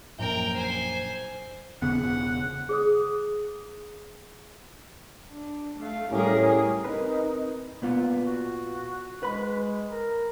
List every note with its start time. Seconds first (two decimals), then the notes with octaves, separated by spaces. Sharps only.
0.19 A#1 F#2 A#4 G5
0.56 C5 G#5
1.82 E1 C#3 B3 F#5
2.69 G#4 C5 D#6
5.31 D4
5.79 A3 F5
6.12 A2 G3 C#4 G4 G#4 A#4
6.85 C4 D#4 A#4 B4
7.82 A#2 B3 F4
8.26 F#4
9.23 G#3 B4 B5
9.90 A#4